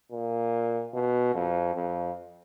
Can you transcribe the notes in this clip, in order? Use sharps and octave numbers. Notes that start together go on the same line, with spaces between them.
A#2
B2
F2
F2